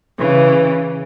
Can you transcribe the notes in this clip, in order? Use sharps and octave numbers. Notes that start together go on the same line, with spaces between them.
C#3 E3